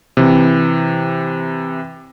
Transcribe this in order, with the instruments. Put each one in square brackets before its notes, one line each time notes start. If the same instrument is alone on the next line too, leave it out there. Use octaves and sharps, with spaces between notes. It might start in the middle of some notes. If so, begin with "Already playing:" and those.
[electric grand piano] C3 E3